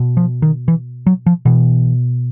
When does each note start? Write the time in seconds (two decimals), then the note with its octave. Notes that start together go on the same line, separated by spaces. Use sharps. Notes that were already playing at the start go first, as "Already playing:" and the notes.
Already playing: B2
0.17 F3
0.42 D#3
0.68 E3
1.07 F#3
1.26 F3
1.45 B2 E3